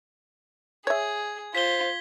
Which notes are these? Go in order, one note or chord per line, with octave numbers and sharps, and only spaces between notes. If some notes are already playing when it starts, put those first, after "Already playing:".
G#4 C#5 E5 G#6
F4 C5 B6 G7